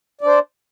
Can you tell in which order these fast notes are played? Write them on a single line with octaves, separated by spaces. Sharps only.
D5 D4 C5